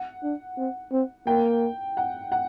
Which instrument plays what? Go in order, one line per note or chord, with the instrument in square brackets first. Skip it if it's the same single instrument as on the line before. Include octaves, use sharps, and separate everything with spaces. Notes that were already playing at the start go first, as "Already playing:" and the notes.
Already playing: [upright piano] F#5
[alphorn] D4
C4
C4
[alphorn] A#3 [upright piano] G5
[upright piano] F#5
F#5